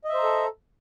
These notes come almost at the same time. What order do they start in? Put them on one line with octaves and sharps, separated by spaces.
D#5 E5 C5 A#5 A4